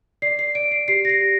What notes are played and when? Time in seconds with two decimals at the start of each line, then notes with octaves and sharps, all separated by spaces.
0.22 D5 C7
0.39 C7
0.55 D5 D7
0.72 C7
0.88 G4 C7
1.05 A#6
1.09 C7
1.21 G4